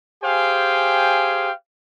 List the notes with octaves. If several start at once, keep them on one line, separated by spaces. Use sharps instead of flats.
G4 G#4 C5 F5 G5 G#5